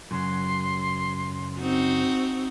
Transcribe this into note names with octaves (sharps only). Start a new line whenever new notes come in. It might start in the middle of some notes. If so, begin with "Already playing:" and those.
F#2 C#3 F#3 C6
C4 D#4 F#4